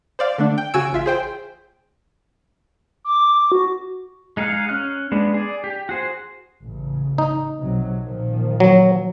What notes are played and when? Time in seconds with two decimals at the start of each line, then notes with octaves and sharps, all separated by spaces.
0.19 C5 D5 F5
0.38 D3 A3 D4
0.58 G5
0.74 C#3 F#4 G#5 E6 D7
0.93 A1 F4 E5
1.06 G#4 C5 G5
3.05 D6
3.52 F#4
4.37 G#3 D#4 G#4 F5 F#5
4.69 C#4 F6 F#6
5.12 G#3 B3 D4
5.34 G#4 D5
5.64 G4
5.89 F#4 G#4 C5
6.65 A1 C#3
7.18 D#4
7.59 B1 C3 F#3
8.03 A#2 D#3 F3
8.60 F#3